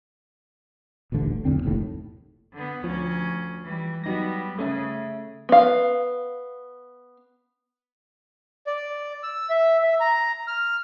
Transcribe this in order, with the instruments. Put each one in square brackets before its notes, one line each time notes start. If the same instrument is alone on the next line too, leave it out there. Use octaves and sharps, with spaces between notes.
[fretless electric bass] D#1 A1 D2 D3
B1 E2 D3 C4
F1 A#1 D#2 A2
[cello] D3 B3
[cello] D2 C#4 [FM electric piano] F3
[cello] E3 G3
[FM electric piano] F#3 D#4 A#6 [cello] G3 B3
[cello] C#3 [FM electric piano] A3 C#4 E5
[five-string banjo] B3 F5
[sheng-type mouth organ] D5
E6
E5
E5
A#5
F6